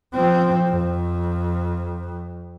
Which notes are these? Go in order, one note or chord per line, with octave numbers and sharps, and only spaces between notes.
F3 C4
F2